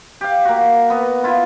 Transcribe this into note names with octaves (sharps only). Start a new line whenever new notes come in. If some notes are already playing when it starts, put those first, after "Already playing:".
G4 F5
A#3 F#4
B3
E4 F4